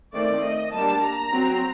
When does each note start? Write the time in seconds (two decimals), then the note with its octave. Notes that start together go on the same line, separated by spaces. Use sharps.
0.13 D#3 A3 C4 D5
0.43 D#5
0.72 G3 A#3 D4 A5
1.02 A#5
1.32 F#3 C4